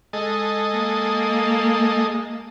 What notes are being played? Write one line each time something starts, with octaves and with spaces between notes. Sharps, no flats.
G#3 A4 D#5
A#3